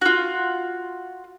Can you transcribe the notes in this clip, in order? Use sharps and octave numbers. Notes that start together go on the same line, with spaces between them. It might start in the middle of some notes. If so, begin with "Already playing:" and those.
F4 F#4